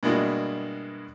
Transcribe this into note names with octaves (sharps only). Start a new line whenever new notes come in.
G2 B2 G#3 A#3 E4